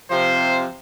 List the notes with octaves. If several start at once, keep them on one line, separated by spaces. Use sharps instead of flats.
C3 F3 C5